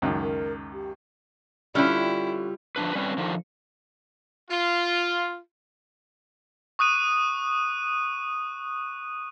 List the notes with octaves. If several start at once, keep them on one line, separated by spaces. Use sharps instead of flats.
C#2 F#2 D#3
A#4
G4
D3 G3 C#4 E4 F4 G5
F3 G#3 D4 B4
G3 C4 C#4 B4
D3 D#3 F3
F4
C#6 D#6 F#6 D#7